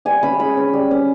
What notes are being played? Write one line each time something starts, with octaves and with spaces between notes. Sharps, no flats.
G3 G#5
C#4 B5
G#3 B5
C#4
G3
C#4